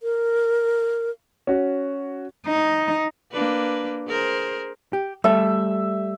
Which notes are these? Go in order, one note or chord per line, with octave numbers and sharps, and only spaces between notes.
A#4
C#4 F#4
D#4
A#3 D4 B4
G#4 A#4 C5
G4
G3 A3 A4 E5